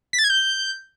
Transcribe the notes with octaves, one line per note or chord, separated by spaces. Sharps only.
B6
A6
G#6
G6